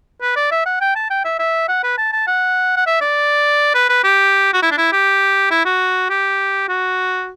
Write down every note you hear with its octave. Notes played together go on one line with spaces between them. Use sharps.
B4
D5
E5
F#5
G5
A5
G5
E5
E5
F#5
B4
A5
A5
F#5
F#5
E5
D5
B4
B4
G4
F#4
E4
D4
E4
G4
E4
F#4
G4
F#4